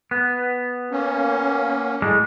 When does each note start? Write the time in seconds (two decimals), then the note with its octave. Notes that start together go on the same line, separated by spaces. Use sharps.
0.11 B3
0.91 A#3 C#4
2.02 A2 G3 G#3